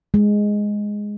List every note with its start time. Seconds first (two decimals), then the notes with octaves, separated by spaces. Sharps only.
0.14 G#3